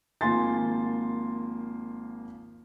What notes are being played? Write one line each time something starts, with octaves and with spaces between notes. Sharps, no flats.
G#1 F3 A#3 G#5 C6 A6